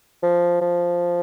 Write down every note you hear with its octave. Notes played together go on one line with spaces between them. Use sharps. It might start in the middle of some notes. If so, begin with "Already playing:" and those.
F3
F3